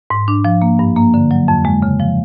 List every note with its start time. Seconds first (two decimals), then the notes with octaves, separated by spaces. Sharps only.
0.10 G#2
0.28 D4
0.45 F3
0.62 A#3
0.79 G2
0.96 A#3
1.14 D3
1.31 F#3
1.48 F2
1.65 G#3
1.82 C#3
2.00 F3